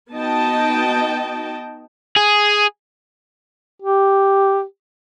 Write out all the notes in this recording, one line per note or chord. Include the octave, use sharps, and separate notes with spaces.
B3 D#4 F#4 D#5 G5 A5
G#4
G4